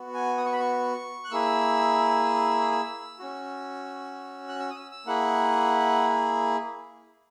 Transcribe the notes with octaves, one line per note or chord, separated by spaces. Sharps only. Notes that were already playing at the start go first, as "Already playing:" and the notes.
Already playing: B3 F#4
G#5
D#6
C#6
B5
C#6
F#6
A#3 E4 G#4 E6
E6
C#4 F#4
F#6
E6
D#6
E6
E6
A#3 E4 G#4 F#5